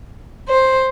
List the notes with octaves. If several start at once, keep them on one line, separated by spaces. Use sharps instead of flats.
C5